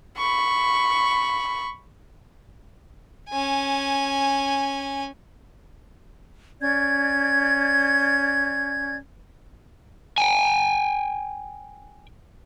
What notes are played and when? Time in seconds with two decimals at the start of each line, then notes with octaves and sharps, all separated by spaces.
0.17 B5 C#6
3.29 C#4 G#5
6.60 C#4 D5 G6 G#6
10.18 G5 G#5